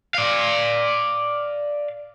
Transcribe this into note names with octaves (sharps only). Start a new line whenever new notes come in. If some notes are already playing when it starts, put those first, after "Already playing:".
D5 F5